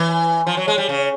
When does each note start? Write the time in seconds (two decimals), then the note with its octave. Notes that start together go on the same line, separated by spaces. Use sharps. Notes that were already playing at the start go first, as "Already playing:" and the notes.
Already playing: E3
0.47 F3
0.57 F#3
0.68 G#3
0.78 G3
0.89 C#3